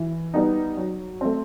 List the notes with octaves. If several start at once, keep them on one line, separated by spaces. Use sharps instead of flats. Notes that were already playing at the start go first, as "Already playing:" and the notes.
Already playing: E3
G3 B3 D#4
F#3
A3 C4